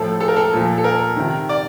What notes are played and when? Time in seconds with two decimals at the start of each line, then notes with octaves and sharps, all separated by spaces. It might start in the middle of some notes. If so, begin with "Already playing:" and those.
Already playing: A2 F3 A4
0.20 A4
0.28 A#4
0.36 A4
0.53 A#2 F3
0.78 A4
0.84 A#4
1.16 C3 D#3
1.49 D5